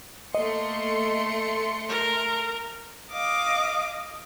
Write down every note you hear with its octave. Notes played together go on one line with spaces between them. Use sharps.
A3 A#3 D#5 C6 C#7
A#4
D#5 F5 D6